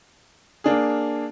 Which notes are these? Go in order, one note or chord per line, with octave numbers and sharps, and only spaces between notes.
A#3 D4 G#4